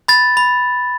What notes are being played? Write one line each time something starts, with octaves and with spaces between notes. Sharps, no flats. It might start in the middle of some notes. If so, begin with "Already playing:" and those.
B5 A6
B5